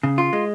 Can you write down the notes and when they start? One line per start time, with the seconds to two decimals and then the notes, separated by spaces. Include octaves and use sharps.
0.03 C#3
0.18 F4
0.33 G#3